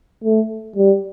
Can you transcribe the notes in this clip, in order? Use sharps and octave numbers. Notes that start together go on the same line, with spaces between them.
A3
G3